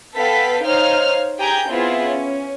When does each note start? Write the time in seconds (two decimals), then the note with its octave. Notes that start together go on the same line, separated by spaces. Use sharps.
0.15 B3 A4 B4 F5 G5 B6
0.63 D#4 C5 C#5 F5 F6
1.39 G4 G#4 G5 G#5 A#5 G6
1.69 B3 C4 E4 F4 G#4
2.06 C#4